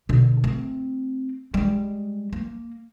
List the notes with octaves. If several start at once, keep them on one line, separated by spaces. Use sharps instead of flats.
B2 D3
A3 C4
G3 G#3
A#3